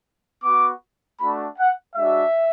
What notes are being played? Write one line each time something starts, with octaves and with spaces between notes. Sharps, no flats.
B3 F#4 D6
A3 D4 F#4 B5
F#5
G#3 D4 F#4 E5